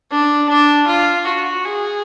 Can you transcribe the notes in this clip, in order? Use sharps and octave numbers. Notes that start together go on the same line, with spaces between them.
D4
D4
F4
F#4
G#4